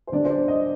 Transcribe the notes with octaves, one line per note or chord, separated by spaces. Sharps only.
C5
D3 G3 D4 D5
C5
D5
D#5